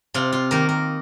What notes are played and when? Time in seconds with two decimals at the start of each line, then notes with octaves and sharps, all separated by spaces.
0.14 C3 F4
0.32 F4
0.51 D#3 A#3 A#4
0.69 A#4